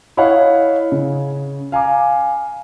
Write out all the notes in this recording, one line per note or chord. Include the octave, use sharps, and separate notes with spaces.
E4 C#5 D#5 F5 F#5
C#3
F5 G#5 A#5 D6